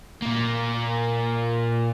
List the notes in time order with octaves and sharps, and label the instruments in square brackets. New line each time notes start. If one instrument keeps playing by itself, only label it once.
[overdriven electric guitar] A#2 A#3